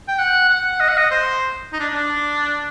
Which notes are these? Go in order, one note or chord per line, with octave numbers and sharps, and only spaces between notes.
G5
F#5
F#5
D#5
F#5
D#5
C5
D#4
D4
D4